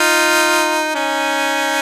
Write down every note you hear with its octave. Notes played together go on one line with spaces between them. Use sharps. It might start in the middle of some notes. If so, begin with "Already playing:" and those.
Already playing: D#4 F4
C#4 D#4